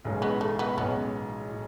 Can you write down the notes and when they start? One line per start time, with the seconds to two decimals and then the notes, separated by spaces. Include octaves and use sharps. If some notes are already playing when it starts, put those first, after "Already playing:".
0.04 B1 A2 E3 G#3 C#4
0.22 B3
0.41 A3
0.59 B3
0.77 B1 A2 E3 G#3 B3 C#4
1.51 A2